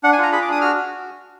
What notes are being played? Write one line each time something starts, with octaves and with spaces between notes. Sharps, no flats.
D4 F#5
G#5
F4 A#5
G#4 B5
D6
D4 D#6
F#4 F6
F#4